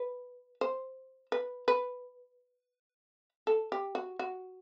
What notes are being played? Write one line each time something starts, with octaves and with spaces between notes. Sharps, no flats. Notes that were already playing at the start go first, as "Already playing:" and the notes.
Already playing: B4
C5
B4
B4
A4
G4
F#4
F#4